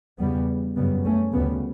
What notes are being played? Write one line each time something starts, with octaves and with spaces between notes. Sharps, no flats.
E2 C#3 G3 B3
F#2 C#3 G3 B3
A3 C#4
D2 C#3 G3 B3